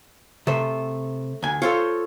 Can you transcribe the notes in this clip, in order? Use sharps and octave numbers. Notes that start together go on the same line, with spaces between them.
C3 A3 C5
D2 G#5
F4 A4 C5 C#5